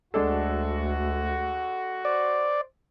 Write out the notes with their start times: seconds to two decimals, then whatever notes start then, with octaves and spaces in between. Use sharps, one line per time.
0.14 D2 G#3 D4 F#4 A4
2.05 C5 D5